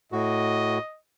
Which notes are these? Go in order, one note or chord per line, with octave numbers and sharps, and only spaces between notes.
A2 F#4 D#5